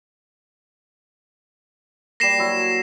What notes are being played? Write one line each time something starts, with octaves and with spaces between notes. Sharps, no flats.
G3 A#3 A#6 C7 E7
F#3 E4